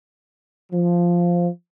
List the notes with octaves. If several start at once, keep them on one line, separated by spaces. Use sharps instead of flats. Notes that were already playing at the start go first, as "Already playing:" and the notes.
F3